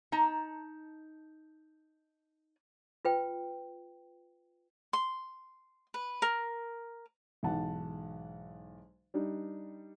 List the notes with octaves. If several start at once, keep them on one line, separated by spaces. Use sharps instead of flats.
D#4 A5 A#5
F4 B4 G5
C6
B4
A#4
B1 G#2 E3 F#5 A5
G3 D4 D#4